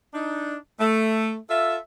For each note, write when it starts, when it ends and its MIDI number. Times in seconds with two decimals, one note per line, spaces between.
0.14 0.55 62
0.14 0.55 63
0.80 1.35 57
1.49 1.77 65
1.49 1.77 69
1.49 1.77 76